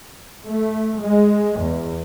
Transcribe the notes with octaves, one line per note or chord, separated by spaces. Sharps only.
A3
G#3
E2